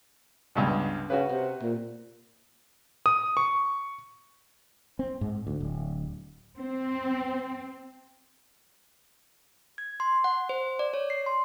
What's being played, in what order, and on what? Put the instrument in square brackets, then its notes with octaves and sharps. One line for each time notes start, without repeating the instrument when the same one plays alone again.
[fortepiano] C#2 G2 B2
[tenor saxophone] C#3 [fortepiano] F#4 B4
[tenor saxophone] C3
A#2
[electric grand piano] D#6
C#6
[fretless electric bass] C4
G#2
D2
D1
[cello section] C4
[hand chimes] G#6
C6
F#5
C5
D5
C#5
C7
C6